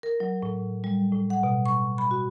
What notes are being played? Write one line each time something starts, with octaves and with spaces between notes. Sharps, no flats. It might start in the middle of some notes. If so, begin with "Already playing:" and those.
A#4
F#3
A2
G3
A2
F#5
B2
C#6
B5
F#4